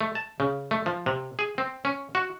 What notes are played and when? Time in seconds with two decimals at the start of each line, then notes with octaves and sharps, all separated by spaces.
0.01 A3
0.15 A5
0.40 C#3
0.71 A3
0.86 F3
1.06 C3
1.39 G#4
1.58 C4
1.85 C#4
2.15 F#4